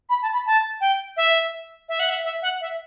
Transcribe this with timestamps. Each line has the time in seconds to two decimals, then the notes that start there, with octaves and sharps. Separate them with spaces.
0.09 B5
0.22 A5
0.33 B5
0.46 A5
0.81 G5
1.17 E5
1.89 E5
2.00 F#5
2.09 E5
2.25 E5
2.42 F#5
2.61 E5